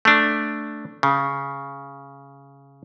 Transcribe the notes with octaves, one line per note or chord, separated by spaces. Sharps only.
A3 D4
C#3